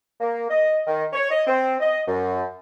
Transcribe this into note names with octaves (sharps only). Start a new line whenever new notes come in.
A#3
D#5
D#3
C#5
D#5
C4
D#5
F#2